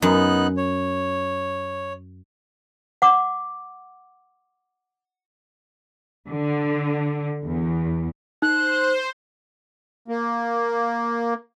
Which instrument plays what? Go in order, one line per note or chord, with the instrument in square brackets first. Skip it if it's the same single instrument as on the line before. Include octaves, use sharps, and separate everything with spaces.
[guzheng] F#2 [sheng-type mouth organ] B3 D#4 F#6
[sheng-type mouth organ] C#5
[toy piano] F#5 D6
[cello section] D3
E2
[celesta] D#4 [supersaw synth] C5 [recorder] F#6
[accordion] A#3